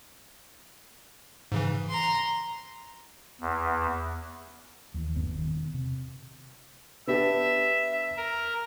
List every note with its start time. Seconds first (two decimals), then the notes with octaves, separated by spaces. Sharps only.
1.52 G#2 C#3 E3
1.90 A#5 C6
3.41 E2
4.94 D#2 E3
5.14 F#1 G2 D3 B3
5.35 E1 A#1 D#3
5.74 C3
7.07 B3 D4 G4 E5
8.17 A#4